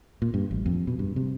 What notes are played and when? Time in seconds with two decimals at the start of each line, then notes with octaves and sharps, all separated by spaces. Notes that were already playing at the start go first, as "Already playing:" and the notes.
0.22 A#2
0.34 G2
0.51 A1
0.66 F2
0.87 B2
0.99 G2
1.16 C3